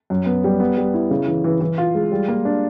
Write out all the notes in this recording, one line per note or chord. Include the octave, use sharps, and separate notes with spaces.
F#2
B3
G3
B3
G3
E4
C#3
E3
E3
E3
F4
G#3
G3
A#3
D4